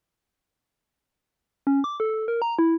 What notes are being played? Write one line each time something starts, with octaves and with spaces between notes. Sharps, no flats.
C#4
D6
A4
A#4
A#5
E4